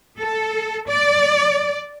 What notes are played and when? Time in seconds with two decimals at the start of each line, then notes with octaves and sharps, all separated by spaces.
0.18 A4
0.89 D5